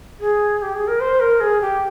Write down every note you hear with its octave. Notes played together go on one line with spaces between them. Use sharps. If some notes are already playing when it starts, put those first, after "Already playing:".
G#4
G4
G#4
A#4
C5
A#4
G#4
G4